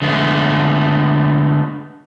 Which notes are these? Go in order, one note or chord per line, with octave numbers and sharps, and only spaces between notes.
D3 G#3 A3 B3